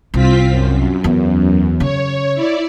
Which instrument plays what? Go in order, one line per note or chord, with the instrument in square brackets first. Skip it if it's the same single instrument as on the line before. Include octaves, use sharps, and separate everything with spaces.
[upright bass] C2 [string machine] C4 F4 B6
[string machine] F#2
[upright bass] E2
[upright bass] C#3 [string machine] C#5
[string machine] E4 D5